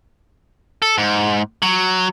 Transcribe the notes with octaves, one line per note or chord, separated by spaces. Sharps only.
A4
G#2
F#3